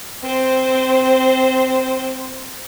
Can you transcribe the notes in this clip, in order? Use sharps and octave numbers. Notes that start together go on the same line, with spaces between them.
C4 C5